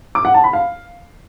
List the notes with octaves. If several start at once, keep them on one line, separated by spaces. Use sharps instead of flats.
D6
F#5
A5
B5
F5